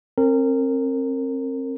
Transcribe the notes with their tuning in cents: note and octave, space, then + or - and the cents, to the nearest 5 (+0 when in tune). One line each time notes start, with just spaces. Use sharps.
C4 +35 A#4 -25